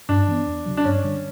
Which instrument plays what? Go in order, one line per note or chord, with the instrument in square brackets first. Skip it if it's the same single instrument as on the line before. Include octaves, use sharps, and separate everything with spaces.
[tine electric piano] G2 [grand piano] D4
[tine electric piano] E3 B3
E2
C#3 F#3
[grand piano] D4
[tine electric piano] G2 [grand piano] C#4
[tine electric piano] D3 G3